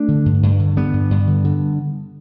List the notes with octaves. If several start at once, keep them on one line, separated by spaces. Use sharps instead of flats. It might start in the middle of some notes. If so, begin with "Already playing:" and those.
Already playing: A3 D4
D3
G2
G2
D3
D3 G3 B3
G2
G2
D3
D3